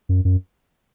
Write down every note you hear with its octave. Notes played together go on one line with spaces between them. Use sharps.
F#2
F#2